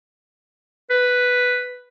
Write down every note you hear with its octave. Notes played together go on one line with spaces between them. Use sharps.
B4